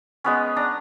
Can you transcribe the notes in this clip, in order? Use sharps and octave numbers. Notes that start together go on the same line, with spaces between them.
G#3 B3 C#4
D4 A#5